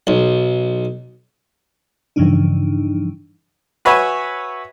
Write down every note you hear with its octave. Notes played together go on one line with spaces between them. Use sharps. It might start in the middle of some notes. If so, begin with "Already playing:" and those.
B1
G2 C#3 E3 F3 D4 D#4
F#4 B4 C#5 E5 G#5